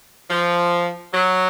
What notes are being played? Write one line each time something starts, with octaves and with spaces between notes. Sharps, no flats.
F3
F#3